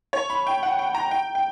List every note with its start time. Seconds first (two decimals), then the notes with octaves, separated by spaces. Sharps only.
0.13 C#5
0.30 B5
0.47 G5
0.63 F#5
0.79 G5
0.95 A#5
1.11 G5
1.35 G5